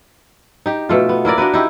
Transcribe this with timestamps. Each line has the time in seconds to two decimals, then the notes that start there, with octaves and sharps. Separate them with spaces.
0.66 D#4 G4
0.89 B2 A3 F4
1.09 B3
1.25 A#3 E4 A#4 D5
1.38 D4 F#4 A#4 B4
1.53 D#4 E4 G4